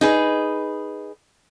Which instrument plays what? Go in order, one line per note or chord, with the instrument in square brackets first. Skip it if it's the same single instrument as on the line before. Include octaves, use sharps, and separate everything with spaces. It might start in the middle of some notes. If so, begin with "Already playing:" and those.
[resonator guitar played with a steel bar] D#4 G#4 B4